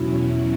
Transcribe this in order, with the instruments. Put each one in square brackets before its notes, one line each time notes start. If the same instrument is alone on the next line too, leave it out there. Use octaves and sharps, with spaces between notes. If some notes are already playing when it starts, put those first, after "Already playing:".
Already playing: [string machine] E2 B2 F#3 C#4 E4